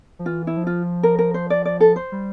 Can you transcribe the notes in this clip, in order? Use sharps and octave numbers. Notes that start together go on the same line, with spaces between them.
F3
E3 F4
E4
F3
F4
A#4
A#4
C5
D5
D5
A4
C5
G3